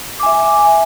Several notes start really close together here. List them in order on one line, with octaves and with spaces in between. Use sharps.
D6 G#5 E5